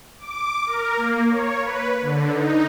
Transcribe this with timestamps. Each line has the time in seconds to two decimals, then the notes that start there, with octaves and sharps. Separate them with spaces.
0.19 D6
0.66 A#4
0.97 A#3
1.28 C#5
1.62 B4
2.02 D3
2.32 D#4